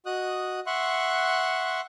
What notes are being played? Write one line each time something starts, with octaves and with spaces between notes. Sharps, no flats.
F#4 D#5 D#6 F#6
E5 F#5 C6 C#6 F#6